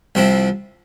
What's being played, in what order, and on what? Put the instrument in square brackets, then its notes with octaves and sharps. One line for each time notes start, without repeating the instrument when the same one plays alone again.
[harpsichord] C2 C3 F3 C4 E4